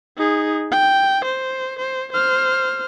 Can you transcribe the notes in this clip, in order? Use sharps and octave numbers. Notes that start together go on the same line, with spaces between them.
D#4 G#4
G5
C5
C5
C5 F6